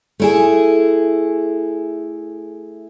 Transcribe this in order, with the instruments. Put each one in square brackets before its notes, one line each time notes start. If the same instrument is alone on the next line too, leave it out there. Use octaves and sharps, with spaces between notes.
[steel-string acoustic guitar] A3 E4 G#4